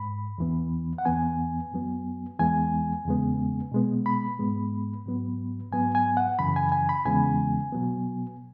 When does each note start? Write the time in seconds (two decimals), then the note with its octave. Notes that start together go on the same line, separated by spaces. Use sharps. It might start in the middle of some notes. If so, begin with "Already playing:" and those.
Already playing: G#2 B5
0.38 E2 E3 B3
0.98 F#5
1.05 E2 E3 B3 G#5
1.72 F#2 F#3 B3
2.39 E2 E3 G#3 B3 G#5
3.05 E2 C#3 G#3 B3
3.72 B2 G#3 B3
4.06 B5
4.39 G#2 G#3 B3
5.06 G#2 F#3 B3
5.72 G#2 F#3 B3 G#5
5.95 G#5
6.17 F#5
6.39 F#2 C#3 E3 B5
6.56 G#5
6.72 G#5
6.89 B5
7.05 E2 C#3 E3 G#3 B3 G#5
7.72 B2 F#3 B3